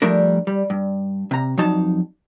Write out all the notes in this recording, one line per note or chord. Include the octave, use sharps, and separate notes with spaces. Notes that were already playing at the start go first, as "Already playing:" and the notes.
F3 G3 A3 D4 A#4
G3
G2
C3 A#5
F2 F#3 D#4 A5